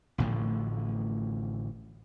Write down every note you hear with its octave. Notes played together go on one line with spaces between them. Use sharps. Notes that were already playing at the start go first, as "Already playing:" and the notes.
A1 A2 D3 F3